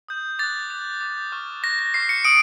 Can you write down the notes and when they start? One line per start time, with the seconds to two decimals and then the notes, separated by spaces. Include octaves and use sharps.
0.09 D#6 G6
0.39 D6 F#6 A6
0.70 D6 F#6
1.01 D6 G6
1.32 C#6 F6
1.63 C#6 F#6 A#6
1.79 A#6
1.94 C#6 F6 C7
2.09 C#7
2.25 D#6 D7